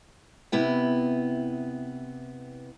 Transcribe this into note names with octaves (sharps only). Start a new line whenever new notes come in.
C3 B3 E4 G5